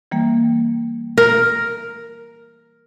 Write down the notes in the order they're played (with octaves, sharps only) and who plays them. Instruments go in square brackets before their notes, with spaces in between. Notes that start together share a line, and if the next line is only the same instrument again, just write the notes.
[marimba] E3 G3 A#3
[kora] A#4